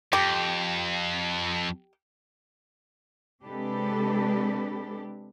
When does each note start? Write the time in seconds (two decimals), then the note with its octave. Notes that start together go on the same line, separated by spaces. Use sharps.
0.13 F2 G4
3.45 C3 G#3 D4 G4 A4 B4